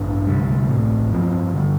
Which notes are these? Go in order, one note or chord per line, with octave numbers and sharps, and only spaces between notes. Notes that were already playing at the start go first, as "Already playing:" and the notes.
Already playing: A1 G2 D4
D2 C3 G3
A1 A2 A3 C4
G2 F3 C4
G2 D3 G3